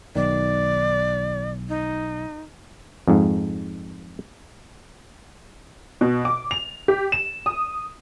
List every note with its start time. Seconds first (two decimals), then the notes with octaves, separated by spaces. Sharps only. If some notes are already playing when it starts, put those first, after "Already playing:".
0.16 B1 D#3 D5
1.69 D#4
3.08 F2 G#2
6.01 B2
6.25 D6
6.51 F7
6.88 G4
7.12 E7
7.46 D#6